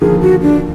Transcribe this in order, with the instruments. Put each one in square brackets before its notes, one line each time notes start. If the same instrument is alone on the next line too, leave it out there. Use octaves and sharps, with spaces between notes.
[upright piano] D#2 D3 F3 A#3 [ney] G#4
[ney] F#4
D4